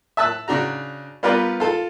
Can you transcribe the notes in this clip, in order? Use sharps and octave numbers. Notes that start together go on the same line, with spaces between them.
E5 A5 E6 F#6
C#3 D4 F#4 A#5
G3 B3 F4 A#4 B4 D5
F4 A4